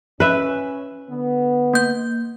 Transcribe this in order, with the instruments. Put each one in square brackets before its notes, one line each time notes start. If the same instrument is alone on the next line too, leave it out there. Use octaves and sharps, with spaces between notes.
[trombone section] C#4 [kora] B4 E5
[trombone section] D3 B3
[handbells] A#3 G6